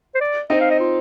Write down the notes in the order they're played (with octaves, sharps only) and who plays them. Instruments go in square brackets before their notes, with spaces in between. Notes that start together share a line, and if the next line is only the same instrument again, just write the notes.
[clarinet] C5
D5
[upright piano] C4 D#4 [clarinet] D#5
[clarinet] F5
D#5
F4